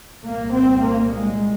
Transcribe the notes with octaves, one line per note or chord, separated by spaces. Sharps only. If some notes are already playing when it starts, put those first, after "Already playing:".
C2 A#2 A#3
C4
A#3
G#3